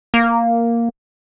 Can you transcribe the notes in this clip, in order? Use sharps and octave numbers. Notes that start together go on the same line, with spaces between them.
A#3